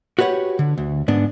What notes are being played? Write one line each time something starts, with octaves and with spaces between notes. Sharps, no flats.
F#4 G4 B4 C#5 F#5
D3
D2
G#2 B3 D4